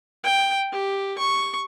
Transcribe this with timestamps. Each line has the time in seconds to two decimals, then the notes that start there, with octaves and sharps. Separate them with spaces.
0.24 G5
0.72 G4
1.18 C#6